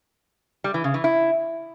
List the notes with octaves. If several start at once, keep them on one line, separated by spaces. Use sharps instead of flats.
G3
E3
C#3
E3
E4